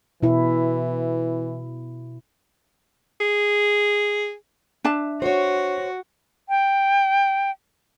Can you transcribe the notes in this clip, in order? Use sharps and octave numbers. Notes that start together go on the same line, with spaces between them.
B2 E3 E4
G#4
D4 E5 A5
F#4 C5 C#5
G5